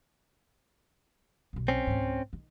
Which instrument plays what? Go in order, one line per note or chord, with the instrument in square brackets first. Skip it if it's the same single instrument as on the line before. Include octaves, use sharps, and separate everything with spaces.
[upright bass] B1 B2
[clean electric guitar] C4 C#4
[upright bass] C#2 G#2
D#3